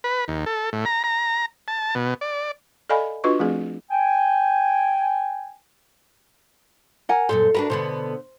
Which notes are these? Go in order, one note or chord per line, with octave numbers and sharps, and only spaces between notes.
B4
D#2
A4
A2
A#5
A#5
A5
B2
D5
A4 D5 D#5 F5 G#5 B5
D4 F4 F#4 B4 D#5 C#6
F3 A3 C4 G#4
G5 G#5
A#4 F#5 G#5
F#2 A#2 A4 C5
D4 F#4 A#4 B4
B2 D3 B3 C5